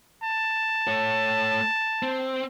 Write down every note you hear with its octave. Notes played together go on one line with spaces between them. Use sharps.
A5
A3 C#5
C4